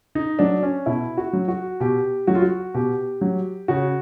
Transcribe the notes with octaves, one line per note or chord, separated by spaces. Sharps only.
D#4
F#3 D4
C#4
B2 E4
F#4
F#3
F#4
B2 G4
F#3 F#4
F4
F#4
B2 G4
F#3
C#3 F#4